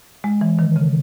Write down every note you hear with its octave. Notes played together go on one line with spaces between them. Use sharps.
G#3
E3
D#3
C#3